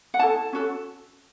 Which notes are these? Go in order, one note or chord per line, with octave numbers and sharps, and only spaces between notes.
F#5
E4 A4 A5
C#4 F#4 A4